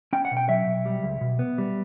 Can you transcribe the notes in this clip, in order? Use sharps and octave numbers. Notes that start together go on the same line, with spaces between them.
C#4 G5
F#5
B2
G5
F#3 E5
B2
G3
C#2
B2
B3
G3